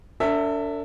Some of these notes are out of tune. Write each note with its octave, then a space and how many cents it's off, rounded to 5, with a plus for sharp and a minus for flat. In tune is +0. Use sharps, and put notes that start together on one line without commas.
D4 -30 A4 +45 E5 +0